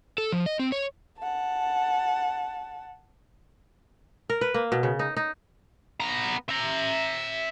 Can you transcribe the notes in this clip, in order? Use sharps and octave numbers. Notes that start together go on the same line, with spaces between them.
A4
F3
D#5
C4
C#5
F#5 A5
A#4
B4
A#3
B2
C#3
D#4
D#4
B3 A#5
E5 A#5